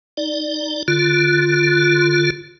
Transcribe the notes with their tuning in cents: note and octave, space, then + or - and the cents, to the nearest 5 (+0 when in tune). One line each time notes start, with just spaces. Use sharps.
D#4 +0 D5 +10
D3 +0 F4 +0